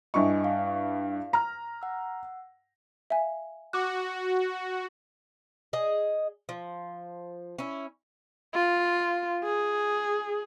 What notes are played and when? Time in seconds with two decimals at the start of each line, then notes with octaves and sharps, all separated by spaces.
0.14 G2 E4 D#5 E5 G#5 C#6
0.44 F5
1.33 A#5 F6
1.82 F#5 E6
3.10 E5 F5 G#5
3.73 F#4 D6 F#6
5.73 G#4 D#5
6.49 F3
7.58 C#4 E4
8.53 F4
9.44 G#4